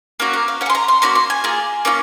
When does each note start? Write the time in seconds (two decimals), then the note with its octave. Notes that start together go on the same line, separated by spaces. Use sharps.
0.20 A#3 C#4 F#4
0.33 A#4
0.48 F5
0.61 C#4 F#5
0.66 G#4 C6
0.75 A#5
0.88 C6
1.02 A#3 C#4 F#4 C6
1.15 C6
1.30 G#5
1.44 A#3 F4 G#4
1.85 A#3 C#4 F4